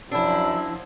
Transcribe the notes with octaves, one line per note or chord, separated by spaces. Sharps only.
F#2 F3 D4 E4 E6